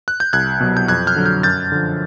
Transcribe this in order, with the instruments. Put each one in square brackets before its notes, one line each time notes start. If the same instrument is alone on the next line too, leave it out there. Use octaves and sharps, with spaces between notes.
[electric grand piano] F#6
G6
C2 F#6 G#6
B2 F#3
G6
F2 F#6 G#6
F6 G6
D3 F#3
F6 G6
F#2 G6 A6
D3 F3